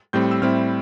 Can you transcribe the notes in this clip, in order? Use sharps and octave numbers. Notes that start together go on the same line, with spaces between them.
A2 G3 C4 G6
E6
A2 G3 C4 E4 F6